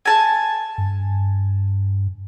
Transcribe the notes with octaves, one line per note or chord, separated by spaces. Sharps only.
G#5 A5
G2